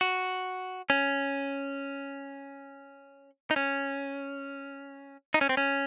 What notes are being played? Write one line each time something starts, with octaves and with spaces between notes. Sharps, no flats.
F#4
C#4
D#4
C#4
D#4
C#4
C4
C#4